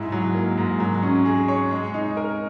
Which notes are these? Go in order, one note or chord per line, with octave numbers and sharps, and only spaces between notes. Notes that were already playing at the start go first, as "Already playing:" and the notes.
Already playing: G#2 E4
F#3
A#3
G#2
F#3
C#4
G#4
C#5
G#3
D#4
A#4